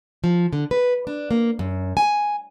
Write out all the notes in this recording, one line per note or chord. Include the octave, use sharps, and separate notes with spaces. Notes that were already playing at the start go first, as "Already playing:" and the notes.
F3
D3
B4
D4
A#3
F#2
G#5